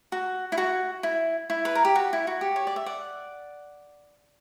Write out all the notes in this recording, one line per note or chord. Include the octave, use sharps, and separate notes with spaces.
F#4
E4
F#4
E4
E4
B4
A#4
G4
F#4
E4
F#4
G4
C#5
D5
E5
D5 F#5